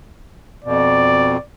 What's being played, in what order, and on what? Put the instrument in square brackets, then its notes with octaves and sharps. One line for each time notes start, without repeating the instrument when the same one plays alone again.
[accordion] F2 B2 [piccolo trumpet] D5